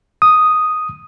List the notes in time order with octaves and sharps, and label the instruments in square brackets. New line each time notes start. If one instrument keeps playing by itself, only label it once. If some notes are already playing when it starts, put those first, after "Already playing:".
[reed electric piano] D#6